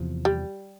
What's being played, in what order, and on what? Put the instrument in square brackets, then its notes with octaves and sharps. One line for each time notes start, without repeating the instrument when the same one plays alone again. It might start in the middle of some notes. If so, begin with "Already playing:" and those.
Already playing: [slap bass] E2 C3 F3
[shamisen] G3